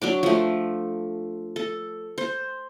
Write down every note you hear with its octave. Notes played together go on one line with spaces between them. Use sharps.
F#3 D4 D6
F3 A3
A4
C5